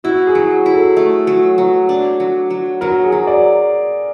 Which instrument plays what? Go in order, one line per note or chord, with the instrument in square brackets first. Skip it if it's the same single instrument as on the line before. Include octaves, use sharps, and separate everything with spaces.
[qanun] E4 [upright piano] F#4
[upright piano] G#4
[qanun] F#3
E4
[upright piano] A4
[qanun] A3
F#3
F#3
D4
F#3
F#3
[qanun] F#3 [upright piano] A#4
[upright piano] G#4
[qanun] F#3
[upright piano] D5